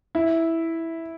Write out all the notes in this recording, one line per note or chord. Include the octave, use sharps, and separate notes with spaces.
E4